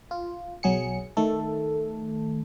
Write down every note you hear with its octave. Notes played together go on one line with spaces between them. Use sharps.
F4
B1 F#3 G#4 C#7
D#3 A3 A4